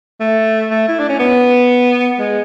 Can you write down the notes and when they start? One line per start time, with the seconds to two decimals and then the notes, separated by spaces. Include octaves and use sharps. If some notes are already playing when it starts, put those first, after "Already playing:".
0.21 A3
0.70 A3
0.89 E4
0.99 D4
1.09 C#4
1.19 B3
2.19 G#3